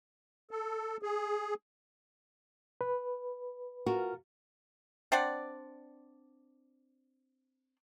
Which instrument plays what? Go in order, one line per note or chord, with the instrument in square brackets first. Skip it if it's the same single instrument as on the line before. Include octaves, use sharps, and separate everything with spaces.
[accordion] A4
G#4
[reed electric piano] B4
[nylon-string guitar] F4 F#4 A#4
[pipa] C4 D4 D5 F#5